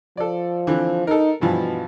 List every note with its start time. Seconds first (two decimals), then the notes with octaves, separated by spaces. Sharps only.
0.17 F3 A4 D5
0.67 D3 E3 C4
1.07 D#4 A4 A#4
1.41 G2 B2 E3 F3